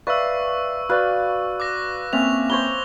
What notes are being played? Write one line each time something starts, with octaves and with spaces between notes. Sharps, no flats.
B4 D5 E5 F5 C#6 E6
F#4 B4 D5 F5
D6 F#6 A#6
A#3 C4 C#4 E5 F7
C5 C#5 B5 G7